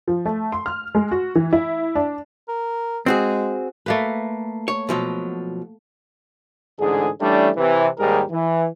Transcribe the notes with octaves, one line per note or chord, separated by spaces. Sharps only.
F3
A3
C6
F6
G#3
F#4
E3
E4
D4
A#4
G#3 C4 F#4 G#4
A3 A#3 B4
C#5
B2 F3 F#3
A1 G#2 D3 G#4
E3 G3 A3 C#4 D4
C3 E3
D#2 G#2 G3 G#4 A#4
E3